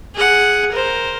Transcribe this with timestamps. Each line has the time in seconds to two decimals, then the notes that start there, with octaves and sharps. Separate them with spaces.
0.15 G#4 F#5
0.72 A#4 C5